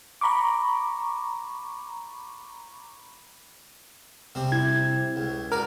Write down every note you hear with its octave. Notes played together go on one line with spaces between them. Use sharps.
A#5 B5 C#6 D6
C3 G3 C4
E4 G#6
C#2
F#4 A#4 B4 D5